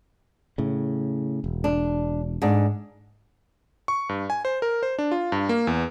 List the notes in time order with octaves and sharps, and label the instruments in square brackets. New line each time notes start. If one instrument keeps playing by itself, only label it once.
[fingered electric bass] A2 C#3
E1
[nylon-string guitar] D4
G#2 D4
[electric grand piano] C#6
G2
G#5
C5
A#4
C5
D4
F4
G2
A#3
E2